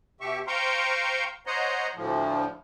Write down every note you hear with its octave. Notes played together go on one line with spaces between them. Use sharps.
B2 G4 E5 C#6
C5 F5 G5 A#5 C6 C#6
C5 C#5 D#5 F#5 A#5 C6
D2 A2 F3